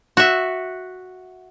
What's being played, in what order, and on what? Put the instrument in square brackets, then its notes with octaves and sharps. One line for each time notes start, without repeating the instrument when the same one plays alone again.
[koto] F#4 E5